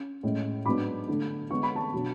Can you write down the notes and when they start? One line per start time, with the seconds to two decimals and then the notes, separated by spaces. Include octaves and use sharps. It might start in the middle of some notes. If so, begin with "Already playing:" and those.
Already playing: C#4
0.23 A2 G#3 C#4
0.65 G#2 F#3 B3 D4 B5 D6
1.08 D3 A3 D4
1.50 D3 G#3 B3 C#6
1.63 B5
1.75 A5 C#6
1.93 B2 F#3 B3 D4